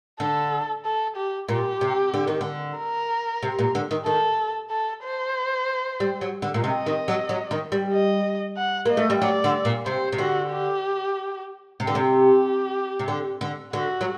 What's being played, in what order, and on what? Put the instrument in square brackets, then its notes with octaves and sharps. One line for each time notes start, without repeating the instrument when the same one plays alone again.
[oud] D3 [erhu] A4
[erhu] A4
G4
[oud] A#2 [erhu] G4
[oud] C3
D3
D#3
D3
[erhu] A#4
[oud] C3
A#2
D3
D#3
[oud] D#3 [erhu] A4
[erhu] A4
C5
[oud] G3
F#3
D3
A#2
[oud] C3 [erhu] D#5
[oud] D#3
F#3
F#3
D#3
G3
[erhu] D#5
F#5
[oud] A#3 [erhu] D#5
[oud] A3
G3
[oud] F#3 [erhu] D5
[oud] D3
A#2
[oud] C3 [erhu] C5
[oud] C3
[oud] D3 [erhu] F#4
[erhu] G4
[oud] C3
D3
C3
[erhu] G4
[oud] C3
D3
D3
[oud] D3 [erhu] F#4
[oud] F#3